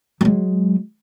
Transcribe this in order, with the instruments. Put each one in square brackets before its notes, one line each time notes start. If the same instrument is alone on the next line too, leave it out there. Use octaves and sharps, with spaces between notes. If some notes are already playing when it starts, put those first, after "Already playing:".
[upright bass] F#3 G#3